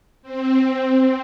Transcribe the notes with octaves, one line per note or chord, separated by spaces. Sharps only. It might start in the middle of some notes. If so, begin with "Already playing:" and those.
C4
C4